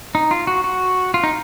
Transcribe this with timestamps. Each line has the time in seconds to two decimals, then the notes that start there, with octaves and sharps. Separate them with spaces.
0.15 D#4
0.31 F4
0.47 F#4
0.64 F#4
1.14 F4
1.24 D#4